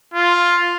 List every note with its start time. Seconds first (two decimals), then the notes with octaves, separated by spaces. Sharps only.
0.14 F4